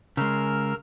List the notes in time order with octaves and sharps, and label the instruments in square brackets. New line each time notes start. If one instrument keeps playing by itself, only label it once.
[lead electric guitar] C#3 G#3 [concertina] A#4 E6 F6